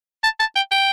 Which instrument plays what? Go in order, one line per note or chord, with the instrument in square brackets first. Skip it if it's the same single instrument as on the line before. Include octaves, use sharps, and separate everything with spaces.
[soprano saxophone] A5
A5
G5
G5